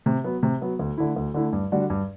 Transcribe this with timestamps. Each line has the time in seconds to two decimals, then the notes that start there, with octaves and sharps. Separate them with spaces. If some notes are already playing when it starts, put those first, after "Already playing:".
0.06 C3
0.24 F#3 B3
0.43 C3
0.62 F#3 B3
0.79 D2
0.98 D3 A3 E4
1.16 D2
1.34 D3 A3 E4
1.53 G2
1.72 D3 G3 D4 F#4
1.90 G2